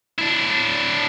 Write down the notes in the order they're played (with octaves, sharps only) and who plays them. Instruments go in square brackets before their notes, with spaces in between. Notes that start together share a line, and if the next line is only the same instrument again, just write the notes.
[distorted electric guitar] D4 E4